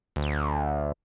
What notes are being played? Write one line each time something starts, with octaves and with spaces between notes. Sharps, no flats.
D2